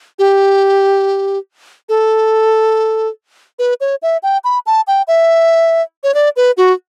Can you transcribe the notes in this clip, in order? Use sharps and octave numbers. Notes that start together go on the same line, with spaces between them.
G4
A4
B4
C#5
E5
G5
B5
A5
G5
E5
C#5
D5
B4
F#4